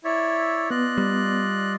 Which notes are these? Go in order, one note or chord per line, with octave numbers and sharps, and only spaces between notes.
E4 C#5 D5 E5
B3 F4 D5 D#5 F#6
G3